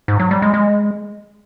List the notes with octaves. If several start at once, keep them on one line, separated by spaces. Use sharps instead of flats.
G#2
F#3
G3
G#3
G#3